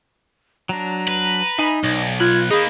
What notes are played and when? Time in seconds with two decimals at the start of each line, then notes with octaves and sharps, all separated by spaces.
0.69 F#3 D4 A#5
1.08 B4
1.58 D#4 E5 G#5 B5
1.84 B1 D5 A#6
2.20 F4 B5 F#6 G#6
2.51 A#3 D#4 G#4 B5